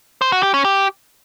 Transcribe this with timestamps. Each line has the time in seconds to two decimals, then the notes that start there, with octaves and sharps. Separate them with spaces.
0.22 C5
0.32 F#4
0.43 G4
0.54 C#4
0.65 G4